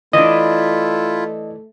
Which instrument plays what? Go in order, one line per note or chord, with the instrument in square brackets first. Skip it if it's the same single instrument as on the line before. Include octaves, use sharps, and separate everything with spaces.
[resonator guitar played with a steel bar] E3 D4 [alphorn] A3 [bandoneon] E4 F4 [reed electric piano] D#5